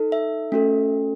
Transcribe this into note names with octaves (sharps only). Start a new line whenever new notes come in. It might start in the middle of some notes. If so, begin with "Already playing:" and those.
Already playing: D#4 A4
E5
A3 C#4 F#4 A4